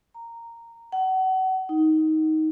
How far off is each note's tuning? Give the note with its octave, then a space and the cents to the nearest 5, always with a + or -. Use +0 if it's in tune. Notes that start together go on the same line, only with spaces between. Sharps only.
A#5 -10
F#5 +30
D#4 +15